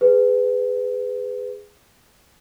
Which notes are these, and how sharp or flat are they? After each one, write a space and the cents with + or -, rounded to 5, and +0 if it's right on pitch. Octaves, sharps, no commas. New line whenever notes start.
G#4 -10 B4 +20